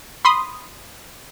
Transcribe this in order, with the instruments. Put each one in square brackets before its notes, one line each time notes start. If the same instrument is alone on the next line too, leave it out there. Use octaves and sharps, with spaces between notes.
[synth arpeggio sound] B5 C6 D#6